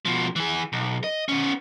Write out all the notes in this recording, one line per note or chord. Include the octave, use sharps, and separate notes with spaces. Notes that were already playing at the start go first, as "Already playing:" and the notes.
B2 F3
E3 G#4
B1
D#5
B3 C#4